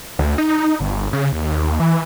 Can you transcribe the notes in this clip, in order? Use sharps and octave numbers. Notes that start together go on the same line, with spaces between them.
D2
D#4
G1
C#3
D#2
E3